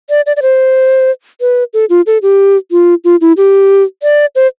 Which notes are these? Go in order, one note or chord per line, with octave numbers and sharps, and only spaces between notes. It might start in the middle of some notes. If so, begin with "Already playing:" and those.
D5
D5
D5
C5
B4
A4
F4
A4
G4
F4
F4
E4
G4
D5
C5